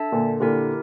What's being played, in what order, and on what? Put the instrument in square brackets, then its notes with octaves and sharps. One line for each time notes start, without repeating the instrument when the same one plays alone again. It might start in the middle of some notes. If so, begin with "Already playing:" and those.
Already playing: [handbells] D4 A4 E5 A5
[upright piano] A#2 D3
[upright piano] A#2 D3 [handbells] E4 G4 A#4